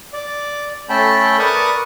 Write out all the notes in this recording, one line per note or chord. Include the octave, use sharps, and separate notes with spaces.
D5
A3 C#4 A4 G5 A5 B5
A#4 B4 D5 A5 C#6 D#6